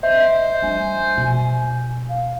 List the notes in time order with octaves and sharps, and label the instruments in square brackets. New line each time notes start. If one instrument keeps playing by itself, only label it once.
[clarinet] C5 [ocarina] D#5 [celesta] E5
[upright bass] G3 D4 [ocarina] G#5
[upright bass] B2
[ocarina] F5